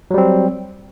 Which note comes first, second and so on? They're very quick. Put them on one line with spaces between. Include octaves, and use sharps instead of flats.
F#3 G3 C4